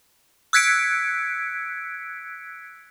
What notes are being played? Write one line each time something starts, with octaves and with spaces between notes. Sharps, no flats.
E6 F#6 G#6 B6 C#7 D7